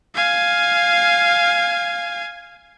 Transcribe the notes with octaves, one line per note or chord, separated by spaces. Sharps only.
F5 G#5